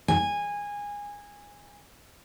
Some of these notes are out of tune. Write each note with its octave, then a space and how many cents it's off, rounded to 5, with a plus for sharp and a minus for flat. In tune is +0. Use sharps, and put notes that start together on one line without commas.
G#5 -15